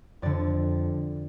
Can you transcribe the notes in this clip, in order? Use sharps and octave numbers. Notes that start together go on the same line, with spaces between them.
F2 D3 D5